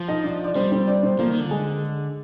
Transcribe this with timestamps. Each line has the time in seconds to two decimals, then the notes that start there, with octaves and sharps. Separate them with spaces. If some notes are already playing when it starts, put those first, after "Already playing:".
Already playing: F3
0.08 D#4 D#5
0.23 D4 D5
0.44 D5
0.55 G3 C4 C5
0.72 C4 C5
0.87 D4 D5
1.03 C4 C5
1.19 F3 A#3 A#4
1.30 D#3
1.40 D3
1.51 G#3 G#4